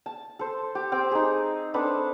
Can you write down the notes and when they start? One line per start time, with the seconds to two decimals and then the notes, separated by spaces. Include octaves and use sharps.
0.06 A5
0.39 A4 C5
0.75 G4
0.92 C4 G5
1.11 D#4 G#4
1.74 C4 D4 A4 B4